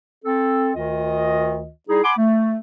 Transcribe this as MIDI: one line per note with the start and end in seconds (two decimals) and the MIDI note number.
0.25 0.71 60
0.25 0.71 69
0.76 1.70 38
0.76 1.70 51
0.76 1.70 65
0.76 1.70 75
1.89 2.02 55
1.89 2.02 63
1.89 2.02 64
1.89 2.02 68
2.04 2.13 78
2.04 2.13 80
2.04 2.13 83
2.04 2.13 84
2.04 2.13 86
2.17 2.60 57